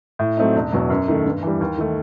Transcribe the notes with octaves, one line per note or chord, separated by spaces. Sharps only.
A2
F#3 A3 C4 D#4
E1
E2 B2 F#3
F#2
D#3 A3
G2
E3 G3
D#2
D#3 A3